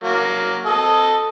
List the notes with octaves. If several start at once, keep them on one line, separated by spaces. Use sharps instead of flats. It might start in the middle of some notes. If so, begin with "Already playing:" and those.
F#3 A#3
A4 D#5